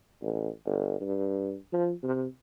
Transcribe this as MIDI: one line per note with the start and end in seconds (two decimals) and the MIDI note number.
0.22 0.49 33
0.66 0.97 31
1.00 1.56 43
1.73 1.93 53
2.03 2.26 48